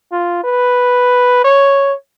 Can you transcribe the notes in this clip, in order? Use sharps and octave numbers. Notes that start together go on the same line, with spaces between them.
F4
B4
C#5